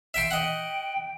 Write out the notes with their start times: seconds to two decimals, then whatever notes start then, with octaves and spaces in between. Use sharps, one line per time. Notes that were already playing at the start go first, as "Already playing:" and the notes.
0.14 E5 G5 C6
0.31 D#5 F#5 G5